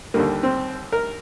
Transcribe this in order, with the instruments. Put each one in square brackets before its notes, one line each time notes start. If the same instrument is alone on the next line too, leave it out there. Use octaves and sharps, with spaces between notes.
[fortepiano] D#2 D3 G3 A#3
C4
A#4